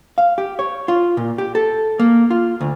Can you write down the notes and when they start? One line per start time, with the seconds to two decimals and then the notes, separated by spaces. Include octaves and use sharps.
0.18 F5
0.38 G4
0.59 C#5
0.88 F4
1.17 A#2
1.38 G4
1.55 A4
1.99 A#3
2.30 F4
2.61 D2